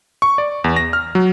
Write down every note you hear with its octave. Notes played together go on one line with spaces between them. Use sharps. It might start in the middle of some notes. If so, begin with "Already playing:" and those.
C#6
D5
E2
A#6
F6
F#3